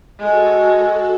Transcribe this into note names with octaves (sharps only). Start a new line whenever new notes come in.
G#3 F#4 A4